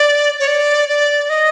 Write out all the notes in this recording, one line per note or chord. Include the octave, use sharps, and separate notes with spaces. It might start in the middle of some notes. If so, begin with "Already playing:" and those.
Already playing: D5
C#5
D5
D5
D#5